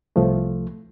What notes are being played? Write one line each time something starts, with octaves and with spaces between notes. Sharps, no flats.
C2 F3 A3